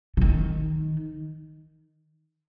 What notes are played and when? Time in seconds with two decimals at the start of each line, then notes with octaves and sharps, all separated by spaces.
0.17 D3
0.21 D#3